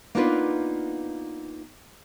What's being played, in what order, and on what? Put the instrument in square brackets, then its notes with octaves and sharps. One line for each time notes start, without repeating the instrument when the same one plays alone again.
[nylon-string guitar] A#3 B3 D4 D#4 F4 B4